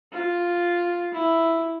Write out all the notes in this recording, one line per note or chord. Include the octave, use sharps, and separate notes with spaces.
F4
E4